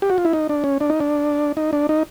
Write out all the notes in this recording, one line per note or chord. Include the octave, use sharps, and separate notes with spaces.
G4
F#4
F4
E4
D#4
D4
C#4
D4
D#4
D4
D#4
D4
D#4